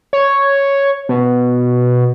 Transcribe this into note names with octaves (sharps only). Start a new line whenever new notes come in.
C#5
B2